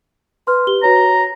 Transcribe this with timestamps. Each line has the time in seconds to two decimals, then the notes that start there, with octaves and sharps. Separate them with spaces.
0.47 B4 C6 F6
0.67 G4 G7
0.83 F#4 C#5 A#5